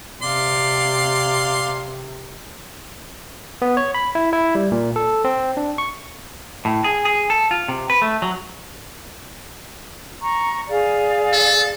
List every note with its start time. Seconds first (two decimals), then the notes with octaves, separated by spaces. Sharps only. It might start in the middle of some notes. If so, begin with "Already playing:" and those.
0.22 C3 D5 F5 C6
3.62 B3
3.77 C#5
3.94 B5
4.15 E4
4.33 E4
4.55 G3
4.72 A#2
4.96 A4
5.25 C4
5.57 D4
5.78 C#6
6.65 A2
6.84 G#4
7.05 G#4
7.30 A4
7.51 F4
7.68 C3
7.90 B4
8.02 A3
8.22 F#3
10.21 A#5 C#6
10.69 G#4 D5 F5
11.33 A4